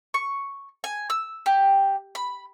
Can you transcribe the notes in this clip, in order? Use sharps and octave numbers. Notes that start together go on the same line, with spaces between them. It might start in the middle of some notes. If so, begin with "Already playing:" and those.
C#6
G#5
E6
G4
B5